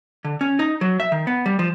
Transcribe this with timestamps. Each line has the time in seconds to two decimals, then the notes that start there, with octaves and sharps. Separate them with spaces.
0.24 D3
0.41 C#4
0.59 D#4
0.81 F#3
1.00 E5
1.12 D#3
1.27 B3
1.46 G3
1.59 F3